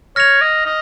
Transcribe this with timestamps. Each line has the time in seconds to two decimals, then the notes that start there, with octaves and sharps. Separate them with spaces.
0.16 C#5 F6 A#6 F7
0.41 D#5
0.66 D#5